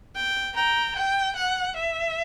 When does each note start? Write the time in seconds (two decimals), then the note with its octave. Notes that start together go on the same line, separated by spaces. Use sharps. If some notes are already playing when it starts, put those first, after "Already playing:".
0.15 G5
0.55 G5 A#5
0.96 G5
1.36 F#5
1.76 E5